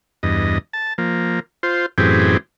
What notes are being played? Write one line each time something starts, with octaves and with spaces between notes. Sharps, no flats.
E2 G2 D#5
A5
F3 A#3
F4 C5
F#2 A2 E3 C4 G4 G#4